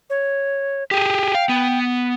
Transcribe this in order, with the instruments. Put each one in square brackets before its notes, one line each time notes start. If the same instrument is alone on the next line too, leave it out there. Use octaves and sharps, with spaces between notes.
[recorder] C#5
[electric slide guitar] G4 G#4 [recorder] G5
[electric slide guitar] F5
B3